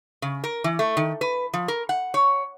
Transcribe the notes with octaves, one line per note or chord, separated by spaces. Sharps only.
C#3
A#4
E3
A3
D#3
B4
F3
A#4
F#5
C#5